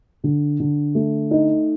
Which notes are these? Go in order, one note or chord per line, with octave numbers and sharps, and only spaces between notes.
D3
D3
A3
D#4